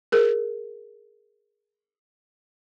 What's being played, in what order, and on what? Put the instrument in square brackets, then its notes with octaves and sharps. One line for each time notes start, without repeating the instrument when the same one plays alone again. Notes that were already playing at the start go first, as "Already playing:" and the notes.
[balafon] G#4 A#4